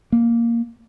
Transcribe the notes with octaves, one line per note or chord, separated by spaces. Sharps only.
A#3